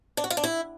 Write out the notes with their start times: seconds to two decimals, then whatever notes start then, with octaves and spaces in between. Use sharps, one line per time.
0.17 D4
0.24 F#4
0.30 F4
0.37 D4
0.44 E4